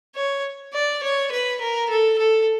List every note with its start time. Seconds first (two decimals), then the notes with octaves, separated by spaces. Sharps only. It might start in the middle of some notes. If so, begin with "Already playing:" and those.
0.15 C#5
0.73 D5
1.03 C#5
1.32 B4
1.61 A#4
1.90 A4
2.18 A4